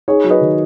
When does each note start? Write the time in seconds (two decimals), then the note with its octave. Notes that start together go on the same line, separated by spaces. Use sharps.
0.08 D#4 G#4 C#5
0.24 F#3
0.30 B4 D#5
0.41 D#3